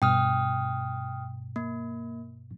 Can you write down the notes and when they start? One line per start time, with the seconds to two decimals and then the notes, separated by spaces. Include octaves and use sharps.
0.02 G2 B2 G5 D#6 F6
1.56 A#3